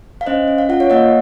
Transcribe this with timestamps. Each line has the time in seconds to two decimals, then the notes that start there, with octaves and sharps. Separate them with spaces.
0.21 F5
0.26 C#4 C5 D#5
0.48 C#4
0.58 F5
0.69 F4 F#5
0.80 C#5 F5
0.90 A#3 D#5 F#5